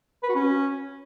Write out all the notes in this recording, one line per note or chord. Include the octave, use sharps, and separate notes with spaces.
B4
F#4
C#4